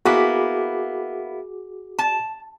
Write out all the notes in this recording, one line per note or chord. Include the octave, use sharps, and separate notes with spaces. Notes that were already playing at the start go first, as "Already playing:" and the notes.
A#3 B3 E4 F#4 G#4 D6
A5